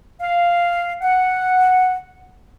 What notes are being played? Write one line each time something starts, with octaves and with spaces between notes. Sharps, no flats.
F5
F#5